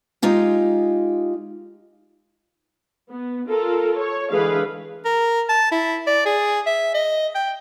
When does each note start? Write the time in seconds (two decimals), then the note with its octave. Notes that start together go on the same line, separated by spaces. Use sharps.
0.22 G#3 D#4 F4 G4
3.11 B3
3.48 F4 A4 A#4
3.99 C#5
4.32 D3 E3 G#3 G#4 B4 F5
5.05 A#4
5.49 A5
5.71 E4
6.07 D5
6.26 G#4
6.66 E5
6.94 D#5
7.35 G5